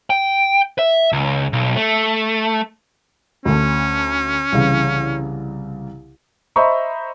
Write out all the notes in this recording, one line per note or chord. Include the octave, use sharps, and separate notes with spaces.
G5
E5
C#2
B1
A3
D2 A3 C#4
C2 C#3 E3
C5 D#5 E5 A#5 B5 C#6